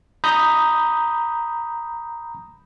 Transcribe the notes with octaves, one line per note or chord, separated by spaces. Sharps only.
A#5 B5 D#6 G6